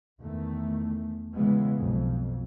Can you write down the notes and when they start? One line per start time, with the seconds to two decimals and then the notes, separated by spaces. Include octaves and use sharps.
0.20 E2 D#3 A3
1.35 C#3 E3 G#3 B3
1.77 B1 F2